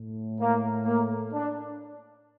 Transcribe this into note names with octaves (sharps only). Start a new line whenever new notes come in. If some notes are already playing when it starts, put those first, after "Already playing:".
Already playing: A2
A#3
A#3
D4